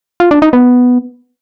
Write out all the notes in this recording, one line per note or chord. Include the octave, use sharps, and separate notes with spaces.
F4
D4
D#4
B3